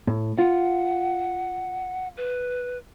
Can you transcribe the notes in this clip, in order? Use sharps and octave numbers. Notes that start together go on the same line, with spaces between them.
A2
F4 F#5
B4